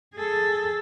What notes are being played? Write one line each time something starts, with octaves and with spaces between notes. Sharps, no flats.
G#4 A4